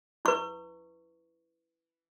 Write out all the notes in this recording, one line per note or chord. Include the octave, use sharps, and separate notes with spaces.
E4 B4 C#6